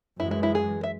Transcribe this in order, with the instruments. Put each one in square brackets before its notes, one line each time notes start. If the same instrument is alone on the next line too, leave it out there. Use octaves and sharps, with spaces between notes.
[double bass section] F#2 E3 G#3 [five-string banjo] E4
[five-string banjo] E4
E4
G#4
E5